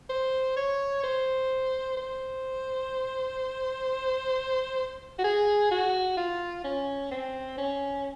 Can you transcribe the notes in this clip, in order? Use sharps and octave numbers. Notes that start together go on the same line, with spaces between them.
C5
C#5
C5
C5
F#4
G#4
F#4
F4
C#4
C4
C#4